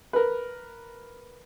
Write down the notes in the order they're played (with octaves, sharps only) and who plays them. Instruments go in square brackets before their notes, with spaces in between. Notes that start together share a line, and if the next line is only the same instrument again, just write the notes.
[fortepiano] A#4 B4